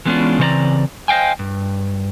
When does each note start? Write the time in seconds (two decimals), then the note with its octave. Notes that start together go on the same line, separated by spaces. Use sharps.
0.05 E3 G#3 B3 C#4 D4 F4
0.39 C#3 E3 C4 C#5 D5 A#5
1.08 C5 D#5 F5 G5 G#5
1.39 G2